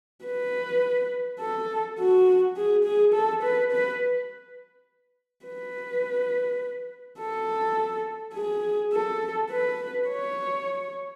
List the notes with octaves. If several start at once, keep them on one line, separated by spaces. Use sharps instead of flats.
B4
A4
F#4
G#4
G#4
A4
B4
B4
B4
A4
G#4
A4
B4
C#5